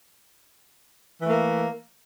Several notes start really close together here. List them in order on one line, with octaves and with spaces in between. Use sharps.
E3 A3 A#3